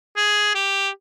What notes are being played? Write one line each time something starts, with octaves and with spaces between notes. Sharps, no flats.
G#4
G4